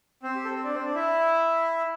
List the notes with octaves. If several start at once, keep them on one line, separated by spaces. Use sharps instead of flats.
C4 C5
G4
A4
C5
D4 D5
C4 C5
D4 D5
E4 E5